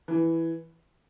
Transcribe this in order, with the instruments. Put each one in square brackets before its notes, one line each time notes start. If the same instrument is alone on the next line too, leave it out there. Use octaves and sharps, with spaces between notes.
[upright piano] E3